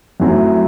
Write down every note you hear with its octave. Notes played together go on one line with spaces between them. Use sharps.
F#2 F#3 A3 C4 E4